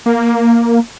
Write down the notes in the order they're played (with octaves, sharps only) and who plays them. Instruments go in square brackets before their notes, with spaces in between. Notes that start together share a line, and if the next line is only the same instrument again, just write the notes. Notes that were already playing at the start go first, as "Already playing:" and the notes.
[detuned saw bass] A#3